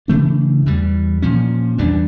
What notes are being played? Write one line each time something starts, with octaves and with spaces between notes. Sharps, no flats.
C#3 E3 A3 D4
E2 E3 G3
A#2 F3 C#4
E2 E3 G3 D4